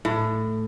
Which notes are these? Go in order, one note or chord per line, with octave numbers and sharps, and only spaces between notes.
A2